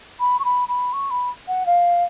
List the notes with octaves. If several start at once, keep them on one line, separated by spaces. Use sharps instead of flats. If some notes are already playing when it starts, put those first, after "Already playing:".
B5
C#6
B5
B5
C#6
B5
F#5
F5